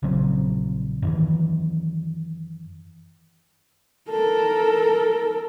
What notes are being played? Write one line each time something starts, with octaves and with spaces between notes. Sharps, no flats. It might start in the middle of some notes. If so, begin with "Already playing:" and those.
A#1 C#3 F#3 C4
F#2 D#3 E3
A4 A#4